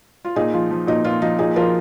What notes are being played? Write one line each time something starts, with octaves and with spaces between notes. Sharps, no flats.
F4
A#2 D#4 G#4
F3 F4
F3
A#2 D#4
A#2 F4
F3 D#4
A#2 D#4 G#4
F3 F4 A#4